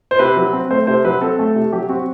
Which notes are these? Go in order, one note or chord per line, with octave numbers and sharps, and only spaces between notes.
C5
C3 B4
F#3
C4
A3 C5
C3 C5
F#3 B4
C4 A4
A3
C3
F#3 G4
C4 F#4